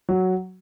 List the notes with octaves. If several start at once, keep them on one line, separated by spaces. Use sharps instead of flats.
F#3